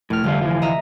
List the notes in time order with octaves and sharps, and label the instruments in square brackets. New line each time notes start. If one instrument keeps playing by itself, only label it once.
[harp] F1 F6 [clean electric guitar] A2
[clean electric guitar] G2 G3 F4 [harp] D3 A3
[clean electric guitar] E3 F3 F4
[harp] D#5 E5 A#5